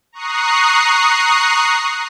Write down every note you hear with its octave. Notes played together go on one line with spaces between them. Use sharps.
A#5 C#6 D#6 F#6 C7